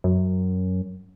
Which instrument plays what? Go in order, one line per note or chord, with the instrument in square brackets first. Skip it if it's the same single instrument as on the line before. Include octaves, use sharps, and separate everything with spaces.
[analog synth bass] F#2